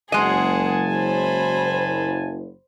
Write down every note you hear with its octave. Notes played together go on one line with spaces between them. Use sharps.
F#1 G#3 G#4 D#5 F#5 G#5 A5
C5 B5